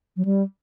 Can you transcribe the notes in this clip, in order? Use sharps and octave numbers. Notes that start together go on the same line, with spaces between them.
F#3
G3